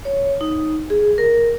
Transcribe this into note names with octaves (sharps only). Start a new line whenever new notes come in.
C#5
D#4
G#4
A#4